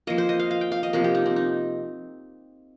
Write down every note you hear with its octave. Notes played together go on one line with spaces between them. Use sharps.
F3 A#3 D#5
C5
D#5
F5
F5
G5
F5
D#5
C3 F3 A#3 A#4
G4
D#4
C4
D#4